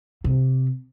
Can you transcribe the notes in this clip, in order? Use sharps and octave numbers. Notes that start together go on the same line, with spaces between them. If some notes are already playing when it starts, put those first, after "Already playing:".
C3